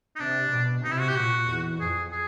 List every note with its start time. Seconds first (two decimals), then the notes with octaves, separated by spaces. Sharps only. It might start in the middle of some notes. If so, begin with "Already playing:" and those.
0.16 D#4
0.19 C3 D4
0.52 B2
0.84 C3 D#4
0.92 E4
1.00 F#4
1.09 G4
1.16 A#2 F#4
1.48 E2
1.80 F2 G#4
2.12 G#4